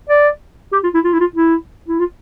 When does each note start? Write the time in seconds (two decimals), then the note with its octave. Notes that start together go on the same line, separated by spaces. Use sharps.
0.09 D5
0.73 G4
0.84 F4
0.94 E4
1.04 F4
1.13 E4
1.20 F4
1.36 E4
1.88 E4
1.99 F4